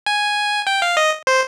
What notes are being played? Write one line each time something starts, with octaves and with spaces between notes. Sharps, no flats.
G#5
G5
F5
D#5
C5